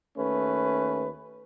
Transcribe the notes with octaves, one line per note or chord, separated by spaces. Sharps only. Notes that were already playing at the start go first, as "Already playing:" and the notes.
D#2 A3 C#4 B4